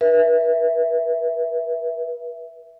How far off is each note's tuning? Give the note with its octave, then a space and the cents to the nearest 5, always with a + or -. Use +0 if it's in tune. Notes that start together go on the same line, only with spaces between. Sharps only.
B4 -35 E5 +0